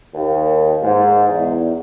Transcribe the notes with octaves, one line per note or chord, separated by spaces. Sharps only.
D#2
G#2
E2